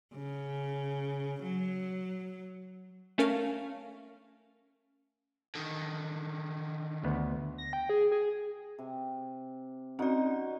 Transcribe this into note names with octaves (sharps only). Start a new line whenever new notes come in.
C#3
F#3
A3 C#4 A#4 F5
D3 D#3
D2 B3
A#6
G5
G#4
G#4
C3
C4 C#4 D#4 F#4 D5 F#5